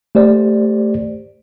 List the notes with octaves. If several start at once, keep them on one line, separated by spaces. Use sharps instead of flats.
A3 G4 C5 D5